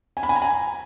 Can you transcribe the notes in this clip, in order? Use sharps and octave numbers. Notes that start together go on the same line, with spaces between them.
G#5
B5
G#5
A#5
G#5